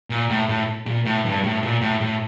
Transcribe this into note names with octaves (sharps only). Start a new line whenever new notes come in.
A#2
A2
A2
A#2
A2
G2
A2
A#2
A2
A2